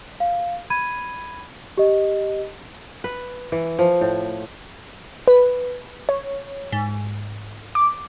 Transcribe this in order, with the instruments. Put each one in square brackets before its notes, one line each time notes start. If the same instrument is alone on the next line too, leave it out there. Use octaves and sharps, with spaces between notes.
[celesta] F5
B5 G#6 D#7
G4 D#5
[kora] B4
E3
F3
A2
[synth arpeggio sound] B4
C#5
G#2
D6